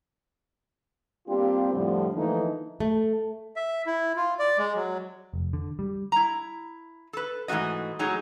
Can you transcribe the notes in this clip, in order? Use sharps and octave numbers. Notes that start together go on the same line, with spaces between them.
G3 A#3 C4 D4 F4 G4
F2 A2 D3 F3 G3
D3 E3 F3 A3 A#3 D#4
A3
E5
E4
F4
D5
G#3
F#3
F1
D3
G3
E4 A#5
A4 B4
G#2 E3 A3 F#4 D#5
A2 F#3 D#4 G#4